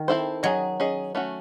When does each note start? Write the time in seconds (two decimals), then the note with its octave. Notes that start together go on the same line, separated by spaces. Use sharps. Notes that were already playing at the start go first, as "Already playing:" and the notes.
Already playing: D#3
0.08 C4 E4 A4 C5
0.43 F#3 C#4 G#4 D#5
0.80 C#4 G#4 D#5
1.15 A3 C#4 F#4